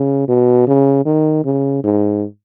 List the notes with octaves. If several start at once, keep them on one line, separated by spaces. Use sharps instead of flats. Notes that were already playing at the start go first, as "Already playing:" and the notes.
Already playing: C#3
B2
C#3
D#3
C#3
G#2